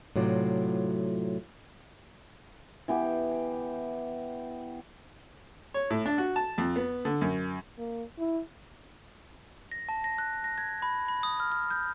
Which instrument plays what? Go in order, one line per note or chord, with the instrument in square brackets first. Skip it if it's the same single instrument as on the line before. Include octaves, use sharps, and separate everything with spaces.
[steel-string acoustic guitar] A2 C3 F#3 F4 D5
[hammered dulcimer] E3 B3 G4
[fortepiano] C#5
A2
D4
F#4
A5
F2
B3
D3
F#2
[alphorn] A#3
E4
[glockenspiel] A#6
A5
A#6
F#6
A#6
G#6
B5
B5
D#6
F6
F6
G6